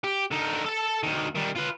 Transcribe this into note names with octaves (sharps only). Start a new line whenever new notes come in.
G4
D3 D#4
A4 A5
D2 D#3
D#3 G3
F4 B4